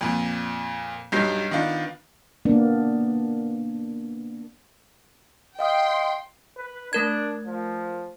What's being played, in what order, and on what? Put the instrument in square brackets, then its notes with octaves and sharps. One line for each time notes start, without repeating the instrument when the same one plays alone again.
[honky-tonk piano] F2 A#2
B1 G2 F#3 G3 G6 C7
D#3 B3 D4 F4
[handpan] A#3 B3 D4
[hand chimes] D#5 F5 D#6 [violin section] G5 C6
[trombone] B4
[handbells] A3 A#4 G#6 [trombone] D4
[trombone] F3